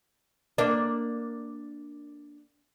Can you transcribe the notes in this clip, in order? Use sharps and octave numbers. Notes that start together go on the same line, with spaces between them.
A#3 D4